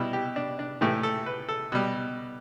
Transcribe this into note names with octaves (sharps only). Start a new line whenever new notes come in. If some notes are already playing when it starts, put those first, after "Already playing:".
Already playing: B2 G3 E4
G4
D4
D4
A2 E3 A3 G4
A4
B4
A4
B2 G3